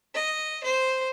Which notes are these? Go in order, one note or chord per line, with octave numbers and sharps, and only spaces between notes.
D#5
C5